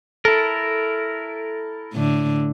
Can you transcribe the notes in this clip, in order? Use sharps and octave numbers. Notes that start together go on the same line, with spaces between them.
E4 A4 A#4
A2 D3